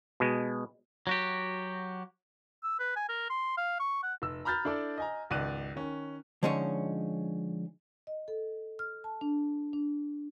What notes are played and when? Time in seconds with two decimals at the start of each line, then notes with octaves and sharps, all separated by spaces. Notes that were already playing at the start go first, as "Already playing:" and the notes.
0.20 B2 G#3
1.07 F#3 F#4 G4
2.63 E6
2.79 B4
2.96 G#5
3.09 A#4
3.30 C6
3.57 F5
3.79 C#6
4.03 F#5
4.22 F1 E6
4.45 A#5 B5 F6 G6 A6
4.65 D4 E4 A4 D5
4.98 D#5 G#5 A#5
5.30 G#1 C#2 D5 F#6 D#7
5.76 D#3 C#4
6.43 D3 F3 G#3 C#4 D#4 C#5
8.07 D#5
8.28 A4
8.79 F6
9.04 A5
9.21 D4
9.73 D4